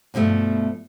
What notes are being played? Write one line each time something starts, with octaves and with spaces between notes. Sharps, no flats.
G2 B2 F3 A3 E4